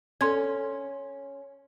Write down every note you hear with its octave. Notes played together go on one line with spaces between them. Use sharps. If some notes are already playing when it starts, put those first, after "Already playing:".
C#4 A4 C6 G#6